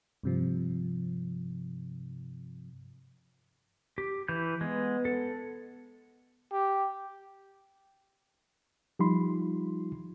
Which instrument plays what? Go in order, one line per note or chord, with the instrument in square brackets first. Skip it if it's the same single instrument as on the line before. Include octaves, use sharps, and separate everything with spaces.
[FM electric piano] G2 C3 F3
[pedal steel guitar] G4
E3 G6
[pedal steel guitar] G#3 [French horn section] B3
[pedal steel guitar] A4
[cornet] G4
[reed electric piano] F3 G3 D#4 F4 B5 C6